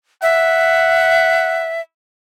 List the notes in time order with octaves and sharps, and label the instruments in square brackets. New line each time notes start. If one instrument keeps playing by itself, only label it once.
[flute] E5 [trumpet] F#5